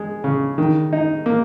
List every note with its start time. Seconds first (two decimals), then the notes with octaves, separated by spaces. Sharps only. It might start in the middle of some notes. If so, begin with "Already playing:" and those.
Already playing: G#3
0.24 C#3
0.58 D#3
0.93 D#4
1.26 A#3